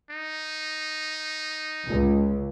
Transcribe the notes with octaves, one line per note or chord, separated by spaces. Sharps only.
D#4
C#2